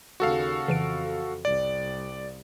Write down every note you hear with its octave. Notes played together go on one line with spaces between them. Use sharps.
D#2 C#3 F#4 A4 F5
F2 C#3 E3 D7
C2 D5